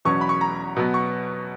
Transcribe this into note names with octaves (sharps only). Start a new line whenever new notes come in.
E2 B2 F#3 C#4 C#6
B5
C#6
A#5
B2 F#3 B3
C#6